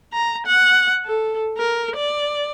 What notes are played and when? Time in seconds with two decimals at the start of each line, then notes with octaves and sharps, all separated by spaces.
0.13 A#5
0.46 F#5
1.05 A4
1.57 A#4
1.96 D5